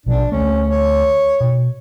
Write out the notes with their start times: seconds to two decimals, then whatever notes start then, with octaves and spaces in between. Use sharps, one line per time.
0.06 A#1 B2 F3 D4
0.32 D2 A3 C#4
0.70 C#5
1.40 B2